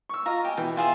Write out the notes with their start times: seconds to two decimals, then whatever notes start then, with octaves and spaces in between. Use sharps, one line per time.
0.09 C#6 E6
0.26 F4 D#5 A#5
0.45 G4 G5 G#5
0.57 B2 E3 G5
0.77 F4 G#4 E5